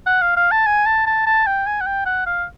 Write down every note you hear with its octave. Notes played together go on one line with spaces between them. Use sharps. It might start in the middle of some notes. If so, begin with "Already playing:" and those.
F#5
F5
F5
A5
G#5
A5
A5
A5
G5
G#5
F#5
G5
F#5
F5